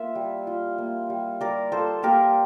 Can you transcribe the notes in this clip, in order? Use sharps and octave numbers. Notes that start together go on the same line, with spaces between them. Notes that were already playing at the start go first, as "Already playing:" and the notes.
Already playing: A#3 F4 E5
G3
F4
A#3
G3
G3 A#4 D5
F4 A4 C5
A#3 G4 A#4